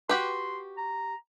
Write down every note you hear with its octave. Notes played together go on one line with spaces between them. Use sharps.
F#4 G4 B4 C6
A#5